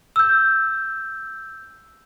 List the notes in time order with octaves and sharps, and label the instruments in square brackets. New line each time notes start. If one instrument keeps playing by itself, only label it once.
[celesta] E6 G6